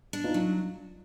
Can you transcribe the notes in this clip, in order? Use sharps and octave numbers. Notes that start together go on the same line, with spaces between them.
D4
D#4 F4
F#3